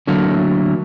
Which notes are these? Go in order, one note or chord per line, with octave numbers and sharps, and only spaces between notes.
D3 F#3 A3 A#3